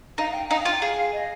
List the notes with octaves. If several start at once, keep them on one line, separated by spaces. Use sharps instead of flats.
D#4 F5
F5
G5
D#4 F5
F5
F4
G5
G#4 F5
D#5